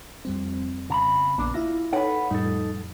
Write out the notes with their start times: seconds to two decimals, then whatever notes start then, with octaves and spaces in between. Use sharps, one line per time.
0.25 F2 G3 C4
0.90 C#3 A#5 B5
1.38 A#1 A#3 B3 D4
1.54 E4 F4 E5 A#6
1.93 D#4 A4 B4 C#5 F#5
2.31 F2 A2 G3 D#4 A4